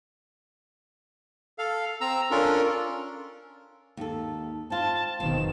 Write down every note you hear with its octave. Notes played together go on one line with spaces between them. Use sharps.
A4 F5
C4 A#5 E6
C#4 D4 F4 A4 A#4
D#2 A4
C4 F4 A5
F#1 B2 D#3 C4 E7